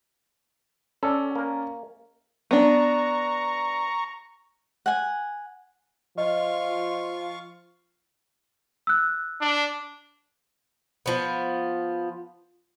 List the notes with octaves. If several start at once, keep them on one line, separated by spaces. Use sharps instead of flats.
C#4 A4 D5
A#3 A#4
B3 D4 A#5 C#6
F#5 G#5
F3 F4 D#5 F5 C#6
E6 F#6
D4
F3 B3